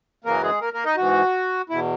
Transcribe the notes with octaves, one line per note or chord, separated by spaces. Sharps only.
F#2 C#3 E3 A#3 A#4
G#3 G#4
A#3 A#4
A#3 A#4
D#4 D#5
G#2 E3 F#4
E2 B2 E4